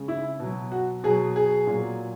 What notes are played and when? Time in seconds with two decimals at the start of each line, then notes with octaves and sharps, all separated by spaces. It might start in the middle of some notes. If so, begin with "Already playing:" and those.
Already playing: C#3 G#3
0.08 E4
0.40 B2 F#3
0.72 F#4
1.04 B2 F#3 G#4
1.36 G#4
1.67 A#2 F#3